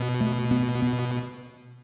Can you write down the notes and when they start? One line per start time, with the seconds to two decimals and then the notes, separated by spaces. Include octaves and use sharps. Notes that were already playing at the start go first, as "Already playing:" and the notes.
Already playing: B2
0.21 A3
0.51 B3
0.82 B3